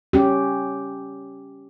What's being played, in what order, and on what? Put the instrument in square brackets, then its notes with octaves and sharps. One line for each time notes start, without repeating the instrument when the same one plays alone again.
[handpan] C#4 G4